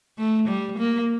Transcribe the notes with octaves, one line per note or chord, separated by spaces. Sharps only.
A3
G3
A#3